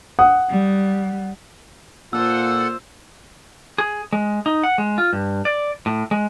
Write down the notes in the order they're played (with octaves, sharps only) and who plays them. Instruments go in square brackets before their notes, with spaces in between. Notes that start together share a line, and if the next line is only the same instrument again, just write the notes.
[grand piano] F#5 D#6
[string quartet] G3
[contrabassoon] A#2 [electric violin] F4 C5 [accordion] A4 F#5 [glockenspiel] E6
[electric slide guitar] G#4
G#3
D#4
F#5
G#3
F4
G2
D5
A2
G#3